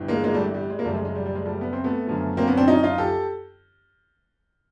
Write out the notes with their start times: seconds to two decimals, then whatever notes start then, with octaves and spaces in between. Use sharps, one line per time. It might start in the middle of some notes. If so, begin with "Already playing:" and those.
Already playing: G1 G2 E3
0.08 G#3 A#3
0.24 G#3 A#3
0.34 G3 A3
0.54 G3
0.70 G#3
0.79 A#3
0.85 F#1 F#2 C#3 F3 G3 A3
0.95 G#3
1.05 G#3
1.15 G3
1.25 G3
1.35 G#3
1.45 G3 A3
1.61 B3
1.73 C4
1.84 A3 B3
2.07 F#1 F#2 D3 F3
2.37 A#3 C4
2.47 B3 C#4
2.57 C4 D4
2.68 C#4 D#4
2.83 D#4 F4
2.98 G4 A4